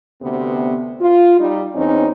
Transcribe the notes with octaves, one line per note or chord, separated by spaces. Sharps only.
D2 C3 B3
F4
G3 D#4
E2 C4 C#4 D#4